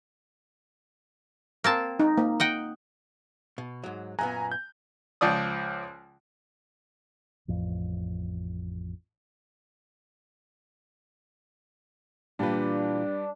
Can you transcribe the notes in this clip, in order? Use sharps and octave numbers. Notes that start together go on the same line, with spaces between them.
A#3 C4 A5
D#4
A#3
D#5 F#5 G5
B2
G#2 F#3
F#2 A#2 B3 G#5 A#5 F#6
G6
C#2 F3 D5 D#6
A1 F2
A#2 E3 G3 D4 F4 G4 B4